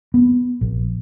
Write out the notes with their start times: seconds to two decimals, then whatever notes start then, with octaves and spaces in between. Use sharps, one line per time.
0.14 B3
0.61 A#1